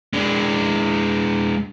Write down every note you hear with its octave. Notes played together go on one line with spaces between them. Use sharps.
G#3 D4